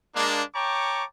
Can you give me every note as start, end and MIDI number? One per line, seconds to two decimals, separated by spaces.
0.16 0.42 56
0.16 0.42 58
0.16 0.42 62
0.55 1.04 73
0.55 1.04 79
0.55 1.04 81
0.55 1.04 82
0.55 1.04 85
0.55 1.04 86